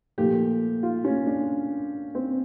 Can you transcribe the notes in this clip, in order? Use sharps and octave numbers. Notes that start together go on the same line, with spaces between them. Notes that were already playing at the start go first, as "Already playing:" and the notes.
A#2 F3 A3 G4
F4
C#4
D4
C4